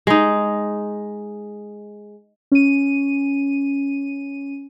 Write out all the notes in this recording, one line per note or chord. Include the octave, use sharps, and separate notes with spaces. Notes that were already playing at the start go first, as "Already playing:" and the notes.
G#3 D#4
C#4 D#7